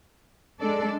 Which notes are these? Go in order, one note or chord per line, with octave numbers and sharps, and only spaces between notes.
G#3 D4 A4 D5